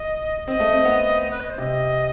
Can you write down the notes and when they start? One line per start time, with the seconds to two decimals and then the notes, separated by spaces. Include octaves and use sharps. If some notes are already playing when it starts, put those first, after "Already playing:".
Already playing: D#5
0.48 C4 D#5
0.60 A3
0.73 C4
0.85 B3
1.22 D#5
1.31 B4
1.40 D#5
1.50 C5
1.58 C3 D#5